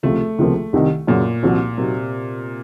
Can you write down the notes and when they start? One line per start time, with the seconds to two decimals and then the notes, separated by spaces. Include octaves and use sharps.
0.03 C#2 C3 F3 A3 C4 F4
0.39 C#2 C3 F3 A#3
0.73 C2 C3 D#3
1.07 F#2 A#2 C#3 F#3
1.43 C2 C3 F3 C4 F#4
1.77 C3 F#3 A#3 D#4 F#4